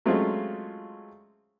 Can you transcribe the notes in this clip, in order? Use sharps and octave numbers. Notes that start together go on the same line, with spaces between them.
F#3 G#3 A3 C4 C#4 F4